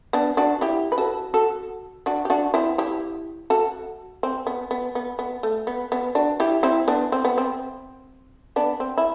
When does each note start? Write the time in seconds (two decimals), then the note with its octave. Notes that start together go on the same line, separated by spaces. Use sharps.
0.13 B3 D4
0.37 D4 F#4
0.61 E4 G4
0.92 B4
0.98 F#4 A4
1.34 F#4 A4
2.06 D4 F#4
2.25 G4
2.30 D4 F#4
2.54 C4 E4
2.78 E4 G4
3.50 F#4 A4
4.23 C4
4.47 B3
4.71 B3
4.95 B3
5.19 B3
5.43 A3
5.67 B3
5.92 B3
6.15 D4 F#4
6.40 E4 G4
6.63 C4 E4
6.88 B3 D4
7.12 C4
7.25 B3
7.38 C4
8.56 B3 D4
8.80 C4
8.98 E4